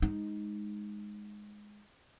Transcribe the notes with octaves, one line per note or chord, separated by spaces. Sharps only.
G#3 D#4